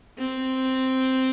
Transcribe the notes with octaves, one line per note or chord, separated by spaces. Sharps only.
C4